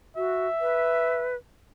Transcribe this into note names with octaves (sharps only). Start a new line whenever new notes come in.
F#4 E5
B4